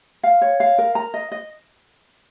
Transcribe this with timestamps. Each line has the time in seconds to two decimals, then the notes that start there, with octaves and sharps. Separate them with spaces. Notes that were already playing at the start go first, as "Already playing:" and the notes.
0.23 F5
0.41 C#5
0.60 F5
0.78 A#4
0.95 A#5
1.14 D#5
1.32 D#5